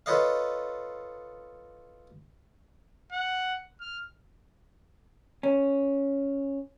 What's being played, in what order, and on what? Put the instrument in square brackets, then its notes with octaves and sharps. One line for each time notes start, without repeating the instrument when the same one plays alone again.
[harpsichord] F4 A4 B4 C#5 D#5 F5
[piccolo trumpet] F#5
F6
[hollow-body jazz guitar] C#4